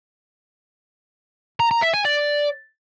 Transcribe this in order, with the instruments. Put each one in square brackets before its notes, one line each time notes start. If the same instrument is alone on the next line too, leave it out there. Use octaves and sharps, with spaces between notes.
[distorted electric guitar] A#5
A#5
E5
G#5
D5